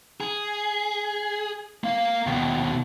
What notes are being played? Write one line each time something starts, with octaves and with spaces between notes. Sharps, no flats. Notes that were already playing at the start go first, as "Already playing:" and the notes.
G#4
A#3 F5
D#2 B2